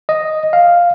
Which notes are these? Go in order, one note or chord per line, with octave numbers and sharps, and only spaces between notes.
D#5
F5